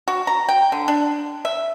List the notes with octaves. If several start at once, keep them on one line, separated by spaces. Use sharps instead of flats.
F#4
A#5
G5
D3
D4
E5